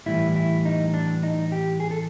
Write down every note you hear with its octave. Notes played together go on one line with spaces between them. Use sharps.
A2 E3 G3 E4
E4
D#4
D4
D#4
G4
G#4
A4